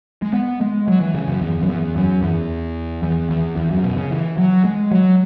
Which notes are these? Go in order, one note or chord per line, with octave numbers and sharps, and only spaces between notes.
G#3
B3
G#3
F#3
E3
C#3
F#2
E2
F#2
E2
F#2
E2
E2
E2
E2
F#2
B2
C#3
E3
F#3
G#3
F#3